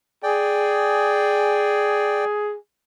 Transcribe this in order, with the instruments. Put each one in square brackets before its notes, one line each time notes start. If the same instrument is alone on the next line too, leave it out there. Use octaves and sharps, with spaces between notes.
[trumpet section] G#4 [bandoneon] D5 G5